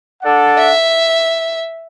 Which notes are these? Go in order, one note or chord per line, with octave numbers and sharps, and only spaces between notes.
D4 A4 D5 F#5
E5